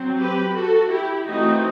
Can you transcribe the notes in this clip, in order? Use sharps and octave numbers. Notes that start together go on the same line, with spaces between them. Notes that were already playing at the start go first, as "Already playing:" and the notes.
Already playing: F#3 C4
G4 B4
F#4 A4
E4 G4
E3 A3 C4 D#4 F#4